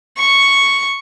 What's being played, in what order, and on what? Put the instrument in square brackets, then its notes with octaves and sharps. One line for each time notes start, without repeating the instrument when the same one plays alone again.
[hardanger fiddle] C#6